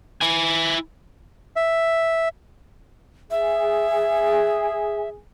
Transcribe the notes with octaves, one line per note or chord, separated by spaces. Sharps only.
E4 G#5
E5
G#4 E5